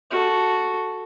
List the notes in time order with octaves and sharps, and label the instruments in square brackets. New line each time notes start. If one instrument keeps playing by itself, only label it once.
[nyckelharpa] F#4 A4